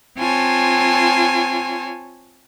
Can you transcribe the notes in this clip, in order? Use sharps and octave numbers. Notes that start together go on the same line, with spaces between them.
C4 F4 C#5 G#5 A5